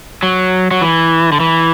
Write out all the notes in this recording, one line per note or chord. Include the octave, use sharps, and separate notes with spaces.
F#3
F#3
E3
D3
E3